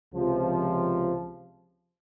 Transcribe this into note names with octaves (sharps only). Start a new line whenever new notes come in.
C#2 C3 F3